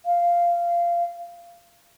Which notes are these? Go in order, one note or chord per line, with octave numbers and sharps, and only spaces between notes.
F5